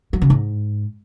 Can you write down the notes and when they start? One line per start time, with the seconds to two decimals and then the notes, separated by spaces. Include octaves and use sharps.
0.13 F#3
0.22 C#3
0.30 G#2